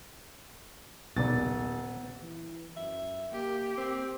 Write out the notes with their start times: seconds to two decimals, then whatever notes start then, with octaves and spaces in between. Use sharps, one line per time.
1.17 D#1 B1 B3 D5 A6
2.22 E3
2.77 F#2 E5
3.32 A#3 G4
3.78 A#3 C4